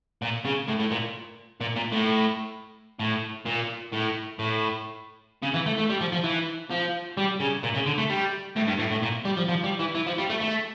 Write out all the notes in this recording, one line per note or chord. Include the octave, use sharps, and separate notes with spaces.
A#2
C#3
A2
A2
A#2
A#2
A#2
A2
A2
A#2
A2
A2
C#3
E3
A3
A3
G3
F3
F3
E3
F3
G3
C#3
A#2
C#3
D3
A3
G3
A2
G2
A2
A2
A#2
G3
F3
F3
G3
E3
E3
F3
G3
A3
A3